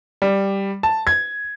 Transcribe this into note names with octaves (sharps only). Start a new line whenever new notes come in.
G3
A5
G#6